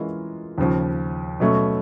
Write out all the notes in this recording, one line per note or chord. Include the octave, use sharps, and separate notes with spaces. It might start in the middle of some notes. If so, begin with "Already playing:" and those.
Already playing: E3 G#3 C#4 F4 A#4
D#2 C#3 F3
B2 F#3 A3 C#4